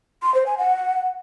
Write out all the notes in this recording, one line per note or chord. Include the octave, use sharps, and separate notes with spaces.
C6
C5
G#5
F#5